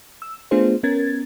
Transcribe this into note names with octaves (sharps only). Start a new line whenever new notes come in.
E6
A3 B3 D4 F4 G#4 C5
B3 C#4 A#4 G#6 A6